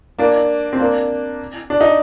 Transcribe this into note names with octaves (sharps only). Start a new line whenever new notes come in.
A#3 D4
C4
A#3 D4
D4
D#4